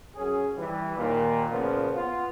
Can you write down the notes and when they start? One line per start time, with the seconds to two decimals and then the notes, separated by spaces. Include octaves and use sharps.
0.15 F#2 C#4 G#4
0.56 E3 G3
0.96 D#2 A#2
1.50 A#2 C#3 F3 B3
1.95 B3 F4